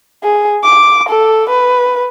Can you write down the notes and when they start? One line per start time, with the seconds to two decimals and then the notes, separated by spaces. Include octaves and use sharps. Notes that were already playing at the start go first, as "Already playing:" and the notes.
0.23 G#4
0.63 D6
1.09 A4
1.49 B4